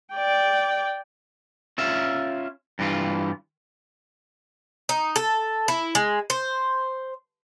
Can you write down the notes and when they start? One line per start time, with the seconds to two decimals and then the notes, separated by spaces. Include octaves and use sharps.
0.15 D5 G5
1.78 C#4 F4 E5
2.79 G2 E3 F4
4.89 D#4
5.16 A4
5.68 E4
5.95 G#3
6.30 C5